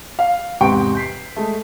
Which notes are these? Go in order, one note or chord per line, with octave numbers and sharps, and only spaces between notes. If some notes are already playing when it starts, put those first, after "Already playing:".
F5
E2 G#2 C3 G5 C#6 D7
G6 B6 C7
G#3 A3